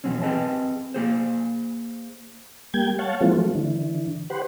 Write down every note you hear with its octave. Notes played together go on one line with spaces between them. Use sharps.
E2 G2 B2 F#3 C4 C#4
C4 G#4 B4 D#5 A5
A#3 G#4 C5
G3 A#3 G5 G#6
C#5 F5 F#5 A5
E3 F3 G#3 A#3 C4 F4
F#3 A3
D3 E3
G4 B4 C5 F#5